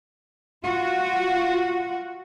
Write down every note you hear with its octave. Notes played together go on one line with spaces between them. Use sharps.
F4 F#4